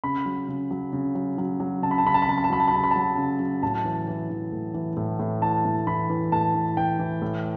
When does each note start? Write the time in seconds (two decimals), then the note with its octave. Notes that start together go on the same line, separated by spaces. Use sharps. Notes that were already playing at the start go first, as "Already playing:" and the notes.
0.04 C#3 B5
0.25 F#3
0.48 C#3
0.71 F#3
0.93 C#3
1.15 F#3
1.38 F#3
1.60 F#3
1.82 C#3 A5
1.91 B5
1.98 A5
2.05 C#3 B5
2.14 A5
2.22 B5
2.27 C#3 A5
2.38 B5
2.44 A5
2.50 F#3 B5
2.60 A5
2.68 B5
2.72 C#3 A5
2.84 B5
2.91 F#3 A5
3.17 C#3
3.39 F#3
3.63 A2 A5
3.85 E3
4.08 E3
4.30 E3
4.52 A2
4.74 E3
4.97 A2
5.20 A2
5.42 E3 A5
5.65 A2
5.87 E3 B5
6.10 E3
6.32 A2 A5
6.55 E3
6.77 E3 G5
6.99 E3
7.22 A2